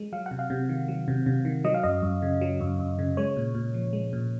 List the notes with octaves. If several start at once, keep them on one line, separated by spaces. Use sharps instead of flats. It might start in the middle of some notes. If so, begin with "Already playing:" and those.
Already playing: G#3
F#3 F5
F#5
C3
F5
C3
D#3
F#3
C3
C3
D#3
F#3 D#5
F5
F#2 D#5
F#2
C#3
F#3
F#2
F#2
C#3
G#3 C#5
A#2
A#2
F3
G#3
A#2